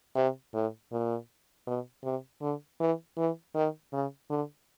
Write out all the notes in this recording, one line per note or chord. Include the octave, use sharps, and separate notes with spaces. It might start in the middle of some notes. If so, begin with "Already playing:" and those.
C3
A2
A#2
B2
C3
D3
E3
E3
D#3
C#3
D3